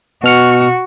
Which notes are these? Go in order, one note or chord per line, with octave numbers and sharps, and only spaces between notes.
B2 F#4 F6 C#7